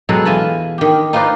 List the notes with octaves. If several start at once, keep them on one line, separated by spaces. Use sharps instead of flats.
B2 F#3 G#3 A4 F#5 A#5
E2 F4 G#5 A5 B5
D#3 G4
D#4 F4 B4 C5 D5 D#5